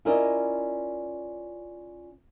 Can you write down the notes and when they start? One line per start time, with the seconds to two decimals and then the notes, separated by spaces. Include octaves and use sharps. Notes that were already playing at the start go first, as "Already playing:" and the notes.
0.05 C#4 E4 F4 A#4 D5 D#5